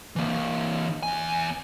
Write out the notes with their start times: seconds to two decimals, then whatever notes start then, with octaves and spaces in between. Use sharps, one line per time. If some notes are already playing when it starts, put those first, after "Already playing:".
0.16 E3 A#3
1.03 E2 G#5